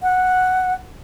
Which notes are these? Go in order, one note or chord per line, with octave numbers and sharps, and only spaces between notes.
F#5